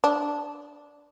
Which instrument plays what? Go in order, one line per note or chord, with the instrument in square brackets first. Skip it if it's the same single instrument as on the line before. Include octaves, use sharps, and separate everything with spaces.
[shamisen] D4